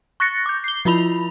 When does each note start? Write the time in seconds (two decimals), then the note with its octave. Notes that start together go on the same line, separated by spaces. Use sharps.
0.20 C#6 F#6 A6 A#6 C#7
0.46 D6 G6
0.64 C7 G7
0.85 F3 E4 F4 B5 F7